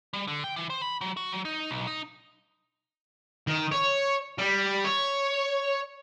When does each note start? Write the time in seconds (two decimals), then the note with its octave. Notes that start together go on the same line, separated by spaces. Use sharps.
0.13 G3
0.27 D3
0.44 G5
0.56 E3
0.70 C5
0.82 B5
1.01 F#3
1.17 F#4
1.32 F#3
1.45 D#4
1.71 B1
1.87 D#4
3.47 D#3
3.72 C#5
4.38 G3
4.85 C#5